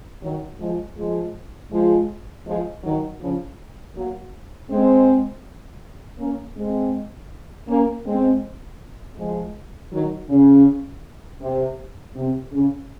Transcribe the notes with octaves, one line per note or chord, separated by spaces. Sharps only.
D#3 F#3
F3 G#3
F3 G#3
F3 G#3
F3 G#3
D#3 F#3
C#3 F3
F#3 A#3
G#3 C4
A#3 C#4
G#3 C4
A#3 C#4
G#3 C4
F3 G#3
D#3 F#3
C#3
C3
C3
C#3